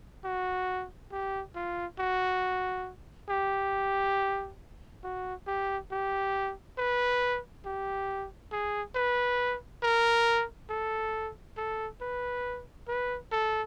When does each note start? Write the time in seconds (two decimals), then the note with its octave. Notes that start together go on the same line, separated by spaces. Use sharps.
0.24 F#4
1.12 G4
1.56 F4
1.99 F#4
3.30 G4
5.04 F#4
5.47 G4
5.92 G4
6.78 B4
7.65 G4
8.52 G#4
8.96 B4
9.83 A#4
10.70 A4
11.57 A4
12.01 B4
12.88 B4
13.32 A4